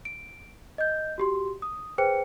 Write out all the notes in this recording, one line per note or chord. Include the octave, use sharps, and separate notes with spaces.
D7
D#5 G6
F#4 G4 C6
D#6
G#4 B4 C5 G5 C#7